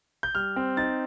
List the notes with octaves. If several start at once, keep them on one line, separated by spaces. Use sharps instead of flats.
G6
G3 F6
C4
D#4 A6